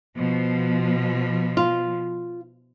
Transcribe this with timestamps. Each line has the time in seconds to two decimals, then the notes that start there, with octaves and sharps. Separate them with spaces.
0.16 B2 F3
1.57 F4